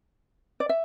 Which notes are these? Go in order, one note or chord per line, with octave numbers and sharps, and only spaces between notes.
D5
E5